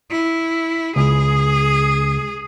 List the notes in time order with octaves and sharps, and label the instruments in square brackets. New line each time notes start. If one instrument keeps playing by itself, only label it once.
[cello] E4
[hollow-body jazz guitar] C#2 [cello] G#4